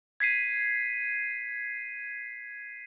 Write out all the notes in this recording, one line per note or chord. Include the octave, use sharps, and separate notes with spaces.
G#6 B6 C7 D#7